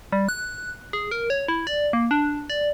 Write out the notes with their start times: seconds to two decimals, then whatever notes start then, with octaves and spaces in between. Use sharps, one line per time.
0.12 G3
0.29 F#6
0.93 G#4
1.11 A#4
1.30 C#5
1.48 E4
1.67 D5
1.93 A#3
2.11 D4
2.50 D5